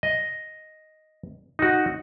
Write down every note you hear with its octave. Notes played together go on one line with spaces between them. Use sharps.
D#5
D#4 F#4